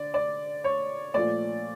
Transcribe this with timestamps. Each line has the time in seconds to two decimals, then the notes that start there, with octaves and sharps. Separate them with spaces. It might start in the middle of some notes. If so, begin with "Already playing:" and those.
Already playing: D3 D5
0.14 D5
0.64 C#5
1.14 A#2 F3 A3 D5